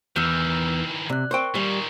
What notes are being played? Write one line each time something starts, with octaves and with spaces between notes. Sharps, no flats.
E2 D#3 E3 E6 F6 G6
C3 D5 F#6
A#4 C5 G5 C#6
A#2 D#3 G3